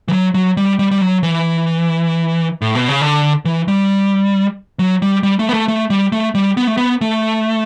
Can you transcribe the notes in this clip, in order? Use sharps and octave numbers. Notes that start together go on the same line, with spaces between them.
E3
F#3
F#3
G3
G3
G3
F#3
E3
A2
B2
C#3
D3
E3
G3
F#3
G3
G3
A3
B3
A3
A3
G3
A3
G3
B3
A3
B3
A3